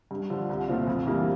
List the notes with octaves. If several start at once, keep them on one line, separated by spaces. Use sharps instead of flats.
G2
D3 F3
C2
A#2 A3 C4 F4
F2
E3 G3 A#3 F4